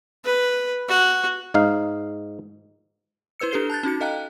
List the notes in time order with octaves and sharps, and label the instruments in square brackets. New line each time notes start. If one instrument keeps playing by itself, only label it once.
[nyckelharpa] B4
F#4
[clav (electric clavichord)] G#2 D#4 F5
[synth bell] E4 B4 C5 E6 C#7
D4 G4 A4 B4 C7 G7
A5 F#6 G6 A6
C#4 D#4 F#4 C#7
A4 D#5 F5 G5 A#5 F#6